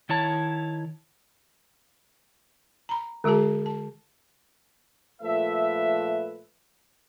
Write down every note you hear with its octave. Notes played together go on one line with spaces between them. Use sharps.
D#3 E4 C#5 A5
A#5 B5
D3 G#3 F#4 G#4 A5
A5
A#2 F3 A3 B4 E5